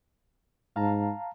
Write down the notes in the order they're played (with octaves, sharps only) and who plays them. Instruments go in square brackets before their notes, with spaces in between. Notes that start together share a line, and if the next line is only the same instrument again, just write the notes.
[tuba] G#2 [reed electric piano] F5 A5 A#5